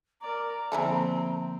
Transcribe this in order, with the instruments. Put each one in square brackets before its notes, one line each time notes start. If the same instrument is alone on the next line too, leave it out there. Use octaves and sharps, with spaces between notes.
[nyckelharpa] A#4 D5 [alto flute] A#5
[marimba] D3 F3 A#3 [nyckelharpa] C4 C5 [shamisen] E4 G#4 A4